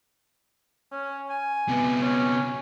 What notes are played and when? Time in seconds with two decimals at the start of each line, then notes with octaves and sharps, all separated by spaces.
0.92 C#4
1.29 G#5
1.69 C3 B3
2.01 C#4